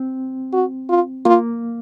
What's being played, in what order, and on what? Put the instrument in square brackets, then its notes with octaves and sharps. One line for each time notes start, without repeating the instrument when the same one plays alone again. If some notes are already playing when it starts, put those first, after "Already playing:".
Already playing: [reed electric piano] C4
[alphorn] F#4
F4
[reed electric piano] A#3 [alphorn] F4